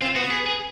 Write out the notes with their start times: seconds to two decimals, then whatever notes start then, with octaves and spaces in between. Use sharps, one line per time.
0.01 C4 F4
0.16 B3 F#4
0.31 G#4
0.46 G#4